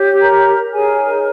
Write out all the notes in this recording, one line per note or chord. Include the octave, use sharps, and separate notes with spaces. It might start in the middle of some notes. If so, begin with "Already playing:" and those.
Already playing: G4 C#5
A#4 A#5
D#4 G#4 A#4 C#5 G#5